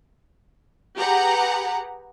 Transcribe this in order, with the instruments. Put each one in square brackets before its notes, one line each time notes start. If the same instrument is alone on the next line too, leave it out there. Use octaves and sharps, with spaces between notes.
[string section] G4 G#4 B4 F#5 A#5